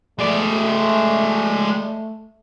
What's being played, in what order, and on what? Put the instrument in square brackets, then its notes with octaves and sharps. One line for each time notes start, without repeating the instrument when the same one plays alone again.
[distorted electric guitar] G#3 D5 [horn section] A3